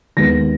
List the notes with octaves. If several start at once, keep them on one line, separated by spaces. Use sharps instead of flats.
D#2 D#3 G#3 B3 A#6